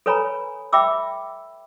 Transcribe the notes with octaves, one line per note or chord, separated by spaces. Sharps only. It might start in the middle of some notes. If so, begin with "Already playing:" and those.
A4 B4 C#5 G#5 A#5 B5
E5 G5 B5 D6 E6